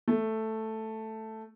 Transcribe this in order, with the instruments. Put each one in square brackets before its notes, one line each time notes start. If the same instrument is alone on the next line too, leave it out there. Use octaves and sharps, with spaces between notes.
[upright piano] A3